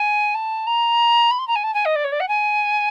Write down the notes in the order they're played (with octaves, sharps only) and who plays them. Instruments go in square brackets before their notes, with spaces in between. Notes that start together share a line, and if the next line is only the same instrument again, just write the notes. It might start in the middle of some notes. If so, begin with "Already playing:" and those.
Already playing: [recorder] G#5
A5
A#5
B5
C6
A#5
G#5
A5
G#5
D#5
D5
C#5
D5
F#5
G#5